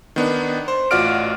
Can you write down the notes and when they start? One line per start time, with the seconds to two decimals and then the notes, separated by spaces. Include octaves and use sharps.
0.16 D#3 B3 D4
0.68 C5
0.91 A1 F4 F#4 D5 F6 D7